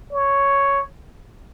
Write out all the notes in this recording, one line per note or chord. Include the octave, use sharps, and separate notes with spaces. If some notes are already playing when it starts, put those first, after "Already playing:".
C#5